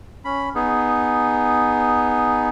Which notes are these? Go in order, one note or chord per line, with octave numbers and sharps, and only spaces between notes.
C#4 B5
B3 D#4 G#4